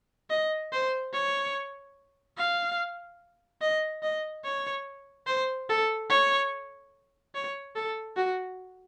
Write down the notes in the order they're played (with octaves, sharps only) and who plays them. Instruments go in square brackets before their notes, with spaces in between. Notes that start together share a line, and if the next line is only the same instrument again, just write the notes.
[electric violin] D#5
C5
C#5
F5
D#5
D#5
C#5
C5
A4
C#5
C#5
A4
F#4